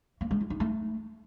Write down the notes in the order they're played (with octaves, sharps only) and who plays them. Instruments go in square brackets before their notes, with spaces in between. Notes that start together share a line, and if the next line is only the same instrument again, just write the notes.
[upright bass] A#3
G#3
E4
D#4
A3